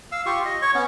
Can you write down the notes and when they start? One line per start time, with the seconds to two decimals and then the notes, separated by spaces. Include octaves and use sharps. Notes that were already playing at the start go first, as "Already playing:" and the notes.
0.12 F5 E6
0.26 F4 G4 C#6
0.45 D#5
0.62 C#5 C#6
0.74 B3 C#4